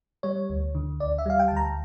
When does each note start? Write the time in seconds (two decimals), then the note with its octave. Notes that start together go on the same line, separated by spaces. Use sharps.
0.23 G3 C#5
0.50 D2
0.75 D3
1.00 D2 D5
1.18 E5
1.26 G3 F5
1.39 G5
1.48 D2 A5
1.57 A#5